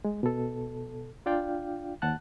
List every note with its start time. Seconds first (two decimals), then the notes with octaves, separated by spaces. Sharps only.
0.05 G#3
0.23 B2 A4
1.26 D4 F4 D5 F5 G5
2.02 D#2 F#5 A5 F#6